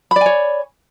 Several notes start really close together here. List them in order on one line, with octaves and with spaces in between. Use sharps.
B5 D5 G#5 C#5